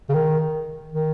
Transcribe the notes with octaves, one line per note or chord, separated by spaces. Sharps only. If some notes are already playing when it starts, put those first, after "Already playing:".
C#3
D#3
D#3